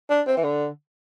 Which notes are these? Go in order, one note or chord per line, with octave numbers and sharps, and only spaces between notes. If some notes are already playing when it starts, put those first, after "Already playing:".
D4
C4
E3
D3